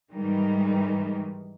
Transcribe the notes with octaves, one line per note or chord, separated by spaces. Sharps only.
G#2 D#3 E3 G3 G#3